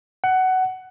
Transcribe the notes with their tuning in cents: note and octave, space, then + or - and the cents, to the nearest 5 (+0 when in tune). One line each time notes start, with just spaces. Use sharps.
F#5 +15